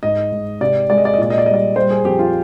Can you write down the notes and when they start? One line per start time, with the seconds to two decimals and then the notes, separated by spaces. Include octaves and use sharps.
0.03 G#2 D#5
0.32 G#2
0.61 C3 D5
0.90 G#3 D5
0.98 D#5
1.05 D5
1.14 D#5
1.18 A#2 D5
1.30 D#5
1.38 D5
1.46 G3 D#5
1.54 D5
1.76 G3 C5
1.90 G#4
2.05 F2 G4
2.19 F4